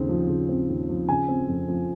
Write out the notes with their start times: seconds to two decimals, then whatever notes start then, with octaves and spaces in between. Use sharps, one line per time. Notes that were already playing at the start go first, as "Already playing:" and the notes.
Already playing: D#2 C#3 C4
0.09 F3
0.29 C#3
0.49 C4
0.69 D#2
0.89 F3
1.08 C#3 G#5
1.28 C4
1.48 F2
1.68 F3